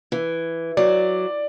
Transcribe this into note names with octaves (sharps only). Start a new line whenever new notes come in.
E3
F#3 D5